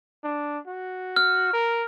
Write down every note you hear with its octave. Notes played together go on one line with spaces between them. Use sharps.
D4
F#4
F6
A#4